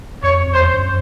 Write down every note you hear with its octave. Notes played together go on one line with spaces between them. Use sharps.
F2 C#5
F2
E2 C5
F2
F#2